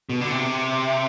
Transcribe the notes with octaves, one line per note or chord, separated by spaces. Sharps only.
B2
D3
C3